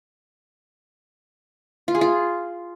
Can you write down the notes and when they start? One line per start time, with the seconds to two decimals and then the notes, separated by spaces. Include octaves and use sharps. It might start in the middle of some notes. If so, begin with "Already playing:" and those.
1.88 F4
1.95 G#4
2.01 F4